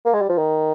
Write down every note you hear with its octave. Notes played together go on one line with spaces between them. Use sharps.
A#3
G#3
G3
F3
D#3